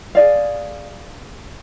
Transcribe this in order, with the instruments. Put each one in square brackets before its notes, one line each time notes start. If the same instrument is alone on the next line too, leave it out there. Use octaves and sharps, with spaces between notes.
[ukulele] G#4 D5 F5